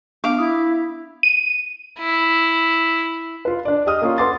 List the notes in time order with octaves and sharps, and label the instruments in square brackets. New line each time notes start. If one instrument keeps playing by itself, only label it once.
[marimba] B3 D4 [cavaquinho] F5 D6
[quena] E4 [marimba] D#6
[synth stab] D#7
[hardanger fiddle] E4
[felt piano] F4 B4
D4 D5
G4 D#5 D#6 F6
A#3 C#4 F4
A4 B4 F#5 C6 D6 A6